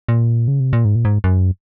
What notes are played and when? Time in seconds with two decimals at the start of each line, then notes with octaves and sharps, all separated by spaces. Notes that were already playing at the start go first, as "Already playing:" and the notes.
0.09 A#2
0.48 C#3
0.60 C3
0.73 A#2
0.85 G#2
0.96 A#2
1.05 G#2
1.24 F#2